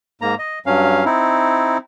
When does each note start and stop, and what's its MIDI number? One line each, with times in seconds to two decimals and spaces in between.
0.22 0.35 44
0.22 0.35 58
0.22 0.35 82
0.39 0.59 75
0.66 1.05 43
0.66 1.05 54
0.66 1.05 61
0.66 1.05 77
1.05 1.78 60
1.05 1.78 63
1.05 1.78 64